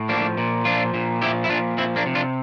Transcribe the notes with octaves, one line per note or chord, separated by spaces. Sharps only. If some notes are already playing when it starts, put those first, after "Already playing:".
Already playing: A2
F3 A#3 D4
A#2
F3 D4 F4
A#2
F3 E4 G4
E4
A#2 D4 F4
F3 C4 E4
A#3 D4
C3
D4 F4